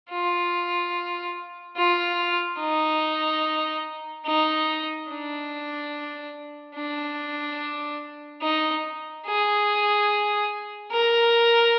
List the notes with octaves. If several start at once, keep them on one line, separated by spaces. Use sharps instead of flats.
F4
F4
D#4
D#4
D4
D4
D#4
G#4
A#4